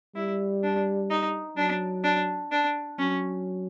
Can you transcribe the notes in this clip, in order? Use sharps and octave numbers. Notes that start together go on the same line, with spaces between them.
G3 E4
D4
D#4
F#3 D4
D4
D4
F#3 C#4